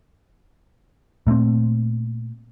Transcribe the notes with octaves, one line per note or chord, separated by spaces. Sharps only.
A#2 A3 B3 C4